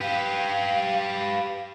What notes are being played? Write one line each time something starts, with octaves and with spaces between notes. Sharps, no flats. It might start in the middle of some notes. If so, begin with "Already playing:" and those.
G4 B4 F5